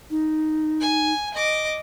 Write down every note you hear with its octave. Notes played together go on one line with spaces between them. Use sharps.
D#4
G#5
D#5 D6